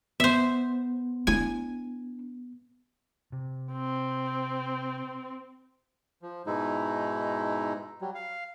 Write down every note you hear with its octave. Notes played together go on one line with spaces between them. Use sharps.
B3 C5 E5
D4 E4 G#5
C3
C4
F3
G#2 B2 G#3 D#4 E4
F#3 G3
F5